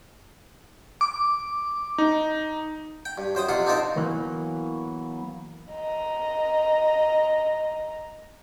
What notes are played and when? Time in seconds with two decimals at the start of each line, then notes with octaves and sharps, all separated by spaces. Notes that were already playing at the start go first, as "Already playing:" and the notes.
1.01 D6
1.98 D#4
3.05 G5
3.18 G2
3.35 F#2 C5 G5 D#6
3.49 F2 C3 F4 F#5 C6
3.66 C4 D4 D#4 F4 A#4 C5
3.96 E3 F#3 A#3 B3
5.72 D#5 A#5